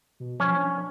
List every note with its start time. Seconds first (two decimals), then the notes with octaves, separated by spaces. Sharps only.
0.20 B2
0.40 F3 C#4
0.56 D4